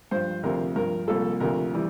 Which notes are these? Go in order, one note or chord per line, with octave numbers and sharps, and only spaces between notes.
G2 F3 C5
D2 C3 F3 A#4
G2 F3 A#4
C2 A#2 F3 A4
D2 C3 F3 A#4
E3 G3